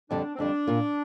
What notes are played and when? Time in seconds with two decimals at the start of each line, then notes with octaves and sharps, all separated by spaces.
0.10 F2 D3 G3 D4
0.35 C4
0.39 F2 D3 G3 D4
0.67 A#2 A#3 F4